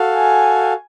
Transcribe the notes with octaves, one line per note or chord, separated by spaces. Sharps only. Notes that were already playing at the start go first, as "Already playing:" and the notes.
Already playing: F#4 A4 F5
G#5